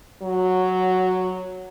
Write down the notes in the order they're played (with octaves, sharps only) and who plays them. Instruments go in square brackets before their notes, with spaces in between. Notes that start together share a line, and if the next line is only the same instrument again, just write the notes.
[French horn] F#3